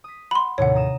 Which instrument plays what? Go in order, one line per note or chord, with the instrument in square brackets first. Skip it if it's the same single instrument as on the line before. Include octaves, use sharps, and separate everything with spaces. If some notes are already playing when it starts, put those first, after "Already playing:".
[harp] D#6 B6
[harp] F#5 [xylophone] B5 C6
[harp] D#2 A2 C3 [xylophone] C#5 F#5
[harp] A#5 D#6 E7